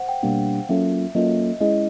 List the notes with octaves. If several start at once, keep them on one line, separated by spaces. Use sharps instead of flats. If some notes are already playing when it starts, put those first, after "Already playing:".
Already playing: C5 F#5
G5
B2 G3 A#3 D4 G4 F5
F#3 A#3 C#4 F4 A4 E5
F#3 A#3 C#4 F4 A4 D#5
G#3 C#4 E4 G#4 D#5